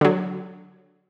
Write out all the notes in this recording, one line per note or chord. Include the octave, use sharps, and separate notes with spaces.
D3 F#3